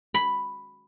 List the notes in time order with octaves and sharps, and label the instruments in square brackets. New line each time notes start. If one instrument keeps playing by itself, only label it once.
[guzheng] B5